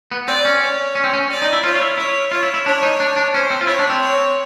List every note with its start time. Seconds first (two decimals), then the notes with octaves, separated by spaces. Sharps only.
0.12 B3
0.28 C4 D5
0.45 C#4
0.62 C#5
0.95 C#4
1.04 C4
1.13 C#4
1.30 D5
1.42 D#4
1.53 E4
1.64 F4 C#5
1.76 F4
1.81 E4
1.98 E4 C#5
2.32 F4 C#5
2.43 E4
2.54 E4
2.66 D4 C#5
2.83 D#4
3.00 D4
3.16 D4
3.34 C#4 C5
3.50 C4
3.61 F4
3.67 E4 C#5
3.79 D4
3.90 C4
4.01 C#5